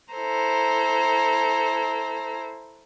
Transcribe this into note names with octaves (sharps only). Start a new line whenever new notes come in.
E4 A4 C5 A#5